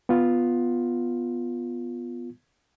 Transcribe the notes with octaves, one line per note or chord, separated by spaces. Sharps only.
B3 F4